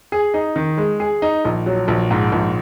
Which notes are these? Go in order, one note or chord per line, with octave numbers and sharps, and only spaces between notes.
G#4
D#4
D#3
G#3
G#4
D#4
A#1
F#3
A#1
G#2
A#1